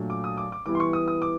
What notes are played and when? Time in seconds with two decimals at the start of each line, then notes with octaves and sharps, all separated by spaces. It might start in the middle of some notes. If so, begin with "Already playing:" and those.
Already playing: A#2 F#3 A3 D4
0.10 D6
0.24 D#6
0.37 D6
0.52 D6
0.66 E3 G3 B3 E4 D6
0.75 C6
0.80 C#6
0.93 D#6
1.08 D#6
1.22 D6